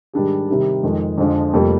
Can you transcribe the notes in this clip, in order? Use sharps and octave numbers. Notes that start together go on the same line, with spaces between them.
G#2 D#3 G3 D4 G#4
C3 D#3 G3
F2 D#3 G#3
F2 D3 F3 G#3 D4
F1 F2 C3 G3 A#3